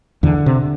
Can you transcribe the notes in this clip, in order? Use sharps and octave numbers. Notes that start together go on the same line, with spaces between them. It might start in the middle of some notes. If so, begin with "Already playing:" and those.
E2 D3
C3